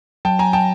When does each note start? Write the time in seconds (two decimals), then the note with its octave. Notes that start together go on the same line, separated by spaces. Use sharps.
0.25 F#3 G5 A5
0.39 G#5 A#5
0.53 G5 A5